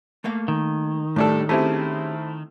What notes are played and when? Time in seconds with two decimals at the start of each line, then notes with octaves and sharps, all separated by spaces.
0.24 A3 A#3 F5
0.48 D#3
1.16 A2 G3 A3 D4 A4
1.49 A3 C4 C#4 E4 G4 G#4